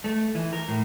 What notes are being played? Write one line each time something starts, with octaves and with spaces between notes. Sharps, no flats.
A3
E3
A#4
A2